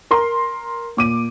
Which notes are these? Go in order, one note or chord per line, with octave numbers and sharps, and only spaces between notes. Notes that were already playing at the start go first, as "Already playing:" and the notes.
A#4 A#5 C6
A#2 D6 D#7